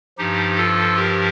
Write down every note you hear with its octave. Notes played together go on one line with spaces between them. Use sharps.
G2 F3 D#4 G4
F4 A4
G4 A#4